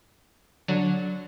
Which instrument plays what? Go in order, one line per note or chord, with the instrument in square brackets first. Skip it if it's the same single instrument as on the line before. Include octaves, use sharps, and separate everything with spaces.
[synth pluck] D3 F#3